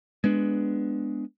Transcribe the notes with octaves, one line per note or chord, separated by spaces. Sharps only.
G#3 B3 D4